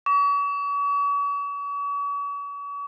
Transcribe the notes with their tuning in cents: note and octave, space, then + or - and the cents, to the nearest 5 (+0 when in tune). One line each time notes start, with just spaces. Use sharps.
C#6 +45